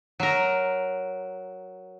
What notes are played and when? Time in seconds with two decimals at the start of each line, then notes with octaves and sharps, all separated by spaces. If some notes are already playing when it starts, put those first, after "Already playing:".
0.20 F#3 A#4